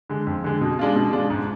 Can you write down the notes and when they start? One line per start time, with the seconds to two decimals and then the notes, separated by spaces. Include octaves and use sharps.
0.09 D3 G#3
0.27 F2
0.44 D3 G#3
0.61 B2
0.79 G#3 D4 F4
0.95 B2
1.13 G#3 D4 F4
1.30 G#2